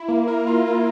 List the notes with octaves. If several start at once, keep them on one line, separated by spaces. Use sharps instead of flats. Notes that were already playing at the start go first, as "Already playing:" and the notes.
Already playing: E4
A#3
A#4
F4
F4